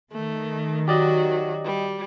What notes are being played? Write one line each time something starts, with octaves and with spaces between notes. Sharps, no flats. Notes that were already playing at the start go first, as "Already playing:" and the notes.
D#3 A3
F#3 F#4 G4 D5 D#5
G3